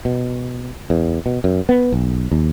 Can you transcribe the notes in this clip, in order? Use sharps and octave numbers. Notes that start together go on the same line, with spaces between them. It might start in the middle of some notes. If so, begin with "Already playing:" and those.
B2
E2
B2
F#2
B3
B1
D#2